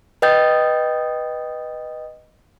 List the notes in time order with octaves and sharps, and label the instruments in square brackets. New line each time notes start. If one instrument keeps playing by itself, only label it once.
[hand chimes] B4 D#5 G5 D#6 G6 A6